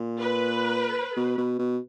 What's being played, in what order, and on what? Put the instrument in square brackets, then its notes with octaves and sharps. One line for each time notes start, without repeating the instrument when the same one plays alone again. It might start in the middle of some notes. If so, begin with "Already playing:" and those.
Already playing: [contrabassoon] A#2
[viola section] B4
[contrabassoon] B2
B2
B2